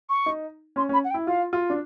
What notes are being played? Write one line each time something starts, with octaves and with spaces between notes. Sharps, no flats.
C#6
D#4
C#4 C6
C#4
B5
F#5
G5
E4
F4 F5
F4
D4